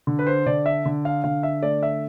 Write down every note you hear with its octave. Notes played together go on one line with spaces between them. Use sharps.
D3
B4
C5
D3 D5
E5
D3
F5
D3 F5
E5
A3 D5
E5